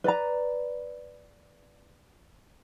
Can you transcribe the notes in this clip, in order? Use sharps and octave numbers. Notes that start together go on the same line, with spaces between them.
B4 D5 A#5